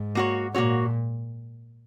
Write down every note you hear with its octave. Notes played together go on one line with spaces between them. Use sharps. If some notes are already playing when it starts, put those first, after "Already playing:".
Already playing: G#2
A#3 F#4 C#5
A#2 A#3 F#4 C#5